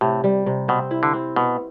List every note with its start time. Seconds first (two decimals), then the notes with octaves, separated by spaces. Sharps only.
0.01 A2 C3
0.24 G3
0.46 C3
0.68 B2 C4
0.91 E4
1.03 D3
1.14 C4
1.36 B2 B3